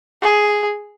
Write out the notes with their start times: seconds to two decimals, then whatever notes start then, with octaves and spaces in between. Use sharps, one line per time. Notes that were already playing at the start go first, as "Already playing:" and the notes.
0.22 G#4